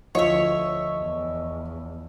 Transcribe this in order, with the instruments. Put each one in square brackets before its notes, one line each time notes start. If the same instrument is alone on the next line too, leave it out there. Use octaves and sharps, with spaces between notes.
[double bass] D2 [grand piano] F3 [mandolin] C#5 E5 [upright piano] D#5
[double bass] E2